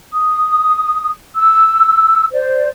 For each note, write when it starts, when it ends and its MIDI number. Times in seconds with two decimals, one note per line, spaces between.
0.12 1.11 87
1.35 2.25 88
2.32 2.68 72
2.32 2.68 74